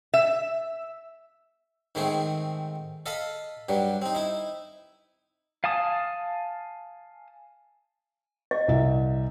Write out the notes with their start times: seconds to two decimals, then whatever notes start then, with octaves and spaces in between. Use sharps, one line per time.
0.14 E5
1.95 G#2 D#3 A3 C4 G#4
3.06 A4 D#5 F5 A5 B5
3.69 G2 F#3 G3
4.02 C4 D#4
4.15 D#4 E4
5.64 F5 G#5 A5 D#6
8.51 D#5
8.68 C2 E5